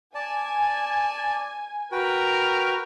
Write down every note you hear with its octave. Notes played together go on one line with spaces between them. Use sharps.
D5 G#5 A5
F#4 A#4 B4 G5